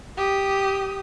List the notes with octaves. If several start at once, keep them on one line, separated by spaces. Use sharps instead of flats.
G4 D#6